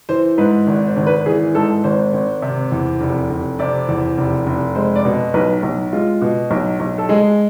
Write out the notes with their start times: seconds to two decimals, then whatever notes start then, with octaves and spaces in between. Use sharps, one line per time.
0.09 E3 C5
0.38 G#2 B4
0.67 G#1
0.87 C5
0.96 G#1
1.07 B4
1.26 E3 G#4
1.55 G#2 A4
1.84 G#1 C5
2.13 G#1
2.42 C3
2.72 E2
3.01 F1
3.30 F1
3.59 C3 D5
3.88 E2
4.18 F1
4.47 F1
4.75 G#3 C5
4.96 D5
5.05 B2
5.34 B1 B4
5.63 B1
5.92 G#3 F4
6.21 B2
6.51 B1
6.80 B1
6.98 A4
7.09 G#3 G#4